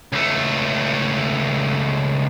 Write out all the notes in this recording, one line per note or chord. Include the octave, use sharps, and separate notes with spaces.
C#2 A3